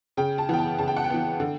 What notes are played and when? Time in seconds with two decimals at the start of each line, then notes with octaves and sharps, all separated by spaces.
0.17 C#3 G5
0.38 A5
0.49 E3 B3 G5
0.59 A5
0.78 C#3 A5
0.88 G5
0.96 F#5
1.04 G5
1.10 E3 B3
1.40 D3